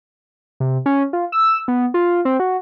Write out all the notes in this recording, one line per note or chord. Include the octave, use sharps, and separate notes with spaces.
C3
C#4
F4
E6
B3
F4
C4
F#4